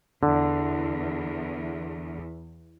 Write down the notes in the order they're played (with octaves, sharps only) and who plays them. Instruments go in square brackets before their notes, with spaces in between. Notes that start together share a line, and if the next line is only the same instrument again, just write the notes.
[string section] E2 [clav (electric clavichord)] D3